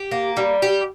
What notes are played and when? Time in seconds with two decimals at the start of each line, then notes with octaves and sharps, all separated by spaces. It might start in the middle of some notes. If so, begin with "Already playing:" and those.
Already playing: G4
0.11 A#3
0.37 G3
0.62 G4